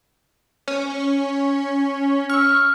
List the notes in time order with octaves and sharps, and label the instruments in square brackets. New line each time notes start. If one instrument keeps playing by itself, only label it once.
[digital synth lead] C#4
[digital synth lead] C#6 [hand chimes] E6 F6